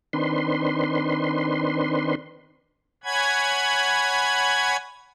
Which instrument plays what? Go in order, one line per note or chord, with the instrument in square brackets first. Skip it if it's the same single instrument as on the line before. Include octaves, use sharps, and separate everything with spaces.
[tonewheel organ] D#3 C4 D4 B4 C6
[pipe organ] C#5 F#5 G#5 B5 G#6